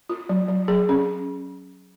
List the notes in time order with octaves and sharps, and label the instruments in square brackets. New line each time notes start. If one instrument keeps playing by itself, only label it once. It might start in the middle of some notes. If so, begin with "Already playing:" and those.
[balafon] F4
F#3
F#3
F#3 G#4
C#4